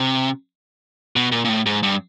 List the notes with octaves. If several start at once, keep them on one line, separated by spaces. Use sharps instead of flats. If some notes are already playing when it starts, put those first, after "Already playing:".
Already playing: C3
B2
A#2
A#2
A2
G#2
G2